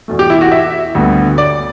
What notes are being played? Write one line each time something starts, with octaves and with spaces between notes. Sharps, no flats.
E2 B2 A3
G4
E4
F#4
E5
D2 D3 G3 B3
D5